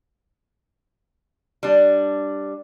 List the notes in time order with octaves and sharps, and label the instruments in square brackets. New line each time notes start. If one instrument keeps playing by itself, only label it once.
[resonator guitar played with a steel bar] G3 D4